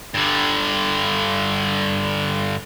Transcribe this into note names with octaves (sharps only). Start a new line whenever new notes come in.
G2 D3